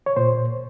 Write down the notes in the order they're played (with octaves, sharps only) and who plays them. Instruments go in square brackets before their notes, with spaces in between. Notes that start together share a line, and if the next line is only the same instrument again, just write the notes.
[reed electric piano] C#5
A#2 C5